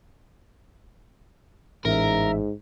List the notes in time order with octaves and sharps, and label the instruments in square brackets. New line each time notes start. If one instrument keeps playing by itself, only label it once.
[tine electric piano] A1 [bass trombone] G#2 [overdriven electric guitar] A#4 [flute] E5